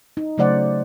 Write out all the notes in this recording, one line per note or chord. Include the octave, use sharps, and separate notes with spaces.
D#4
C#3 F#3 A3 C5 D5 F#5